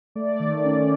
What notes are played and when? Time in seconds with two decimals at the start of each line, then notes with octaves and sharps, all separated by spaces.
0.15 A3 D5
0.40 D#3
0.65 C#4